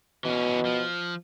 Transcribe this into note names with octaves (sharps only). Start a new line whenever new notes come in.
B2 E3 C#4
F3